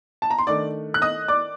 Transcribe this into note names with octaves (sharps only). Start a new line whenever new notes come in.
A5
A#5
C6
D#3 A3 D4 D5 D6
F#6
D#5 D#6
D5 D6